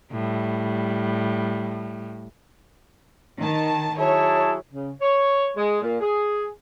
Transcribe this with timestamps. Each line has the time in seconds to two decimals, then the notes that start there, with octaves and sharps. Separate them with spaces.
0.12 A2 G3
3.40 D#3 A5
3.99 F#3 E4 G#4 C#5 A5
4.73 C#3
5.00 C#5
5.56 G#3
5.82 A#2
6.00 G#4